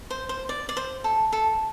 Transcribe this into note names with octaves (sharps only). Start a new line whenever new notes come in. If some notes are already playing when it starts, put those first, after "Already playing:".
C5
C5
D5
D5
C5
A4
A4